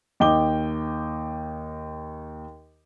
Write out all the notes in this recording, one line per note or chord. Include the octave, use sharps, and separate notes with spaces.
D#2 D#5 G5 D6 G7